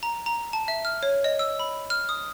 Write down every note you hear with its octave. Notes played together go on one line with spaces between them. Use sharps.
A#5
A#5
A5
E5
F6
C#5
D#5
E6
B5
F6
D#6